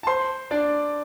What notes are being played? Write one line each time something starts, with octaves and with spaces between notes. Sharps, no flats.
A5
C5 C6
D4 D5